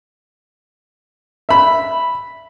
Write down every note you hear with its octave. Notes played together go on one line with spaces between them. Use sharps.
E5 B5